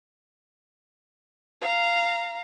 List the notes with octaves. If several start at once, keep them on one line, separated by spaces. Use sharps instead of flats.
F5 A#5